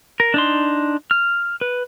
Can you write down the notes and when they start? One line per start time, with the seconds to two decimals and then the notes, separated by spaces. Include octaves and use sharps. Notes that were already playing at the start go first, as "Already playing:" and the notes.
0.20 A#4
0.34 D4 D#4 C6
1.11 F6
1.61 B4